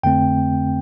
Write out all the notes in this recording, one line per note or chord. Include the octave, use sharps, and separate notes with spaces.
F2 D3 A3 C4 G5